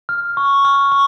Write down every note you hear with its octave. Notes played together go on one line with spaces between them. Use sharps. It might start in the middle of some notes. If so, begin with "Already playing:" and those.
F6
C#6
F6
C#6